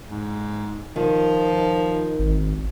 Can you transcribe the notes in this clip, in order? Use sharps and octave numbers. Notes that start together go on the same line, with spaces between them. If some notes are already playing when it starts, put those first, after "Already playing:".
G#2
D#3 F3
G#1